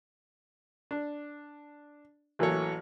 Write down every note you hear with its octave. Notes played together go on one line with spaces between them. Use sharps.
D4
A1 E3 F#3 A#3 A4 C#5